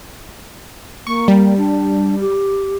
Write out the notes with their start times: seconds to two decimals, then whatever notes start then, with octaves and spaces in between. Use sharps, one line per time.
1.07 A#3 C#6
1.28 G3
1.58 D4
2.21 G4